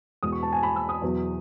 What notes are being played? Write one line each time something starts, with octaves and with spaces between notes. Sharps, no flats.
E2 B2 G#3 B3 D#6
C#6
A5
G#5
B5
E6
D#6
E2 B2 F#3